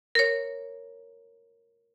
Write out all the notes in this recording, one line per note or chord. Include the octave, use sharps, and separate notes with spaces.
A#4 C#5